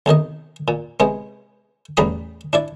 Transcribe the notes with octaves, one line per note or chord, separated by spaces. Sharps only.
B1 C3 D#3 D#5
A#2
C3 G#3 B3
A1 E2 G3 A#5 B5 D#6
D4 E4 D5